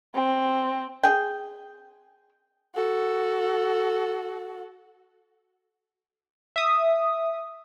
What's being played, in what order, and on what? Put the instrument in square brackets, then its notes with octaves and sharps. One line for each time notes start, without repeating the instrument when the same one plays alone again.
[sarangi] C4
[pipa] G#4 G5
[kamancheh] F#4 A4
[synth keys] E5 D#6